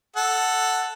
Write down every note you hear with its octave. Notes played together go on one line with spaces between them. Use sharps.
A4 F#5